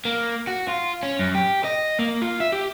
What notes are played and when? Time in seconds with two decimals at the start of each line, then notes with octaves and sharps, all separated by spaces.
0.05 A#3
0.47 F#4
0.68 F4
1.03 C#4
1.19 F#2
1.35 G4
1.64 D#5
1.99 A#3
2.22 F4
2.40 E5
2.52 G4